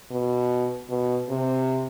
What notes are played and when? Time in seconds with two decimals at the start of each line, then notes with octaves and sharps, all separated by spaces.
0.11 B2
0.89 B2
1.29 C3